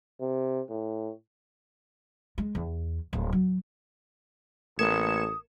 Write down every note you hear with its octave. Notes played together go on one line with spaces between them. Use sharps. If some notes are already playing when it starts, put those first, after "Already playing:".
C3
A2
G#3
E2
D1
F#3
A1 A3 A#3 D#6 G#6 C#7 E7